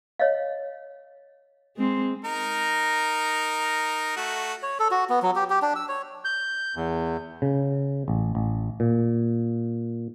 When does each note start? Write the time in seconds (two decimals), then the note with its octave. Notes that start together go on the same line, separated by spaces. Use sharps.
0.19 C#5 D#5 F5
1.76 G#3 C4
2.25 D#4 A#4
4.17 A3 F#4
4.63 C#5
4.79 A4
4.91 F#4
5.09 B3
5.22 F#3
5.36 G4
5.50 G4
5.62 D4
5.76 E6
5.88 C#5
6.25 G6
6.76 E2
7.42 C#3
8.08 A1
8.35 A1
8.80 A#2